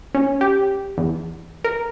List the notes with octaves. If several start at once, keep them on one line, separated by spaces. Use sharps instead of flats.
C#4
G4
E2
A#4